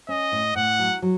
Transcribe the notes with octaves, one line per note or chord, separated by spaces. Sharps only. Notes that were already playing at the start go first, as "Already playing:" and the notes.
C#4 D#5
A2
A2 F#5
F#3
F#3